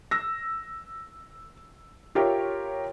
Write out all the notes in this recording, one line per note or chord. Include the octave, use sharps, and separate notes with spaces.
E6 A#6
F4 G4 A#4 C#5 E5